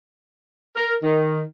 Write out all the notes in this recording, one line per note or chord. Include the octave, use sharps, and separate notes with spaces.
A#4
D#3